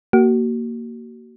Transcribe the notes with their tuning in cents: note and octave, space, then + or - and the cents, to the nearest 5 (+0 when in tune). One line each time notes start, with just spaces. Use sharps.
A#3 -5 F#4 +35